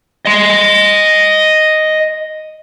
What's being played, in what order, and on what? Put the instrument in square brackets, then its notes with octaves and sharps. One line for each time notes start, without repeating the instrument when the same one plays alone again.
[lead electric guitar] D#5 C6